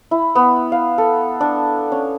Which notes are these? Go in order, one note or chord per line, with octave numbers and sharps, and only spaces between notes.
E4
B3
F5
A4
D4
C#4